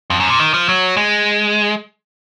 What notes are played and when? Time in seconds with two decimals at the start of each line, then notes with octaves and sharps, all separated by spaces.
0.10 F2
0.20 F#2
0.30 A#2
0.39 D#3
0.54 F3
0.69 F#3
0.97 G#3